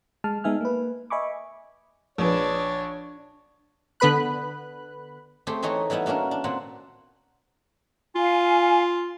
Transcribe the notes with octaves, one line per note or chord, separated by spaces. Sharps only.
G#3 A5 F6
G#3 B3 D#4 E5 G#5 F6
A#3 B4
D#5 E5 G#5 B5 C#6 D6
A#1 D4 B4 C#5
D3 B3 B4 B5 F#6
A3 C4 G4 G#4
E3 A3 D#4 G#4 C#5 D#5
E3 G3 B3 D#4 E4
F#3 A#3 C#4 D4 A#4
D4
A#2 A#3 C4 F#5
F4 F5 G#5